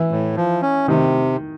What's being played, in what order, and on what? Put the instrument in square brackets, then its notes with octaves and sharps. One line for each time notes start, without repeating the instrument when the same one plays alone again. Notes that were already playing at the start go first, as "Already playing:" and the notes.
Already playing: [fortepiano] E3
[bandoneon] A2
F3
C#4
[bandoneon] C3 [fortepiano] D#3